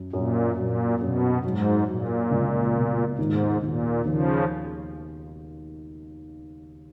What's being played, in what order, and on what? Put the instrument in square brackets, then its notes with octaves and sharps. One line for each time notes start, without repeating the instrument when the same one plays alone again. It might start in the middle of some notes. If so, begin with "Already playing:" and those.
Already playing: [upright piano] F#2
[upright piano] F#2 [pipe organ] A#2
[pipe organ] A#2 [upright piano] F#3
[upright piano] F#2 [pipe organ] B2
[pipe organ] G#2 [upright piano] F#3
[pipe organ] A#2 [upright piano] F#3
[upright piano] C#2
B2
[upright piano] D#2 [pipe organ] G#2
[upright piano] D#2 [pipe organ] A#2
[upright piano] D#2 [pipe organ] C#3 F3